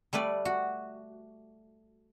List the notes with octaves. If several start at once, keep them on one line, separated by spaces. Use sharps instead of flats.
G3 A3 B4 D5
F#4